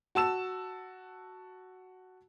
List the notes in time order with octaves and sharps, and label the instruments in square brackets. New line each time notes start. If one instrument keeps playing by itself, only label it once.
[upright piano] F#4 A5 E6 E7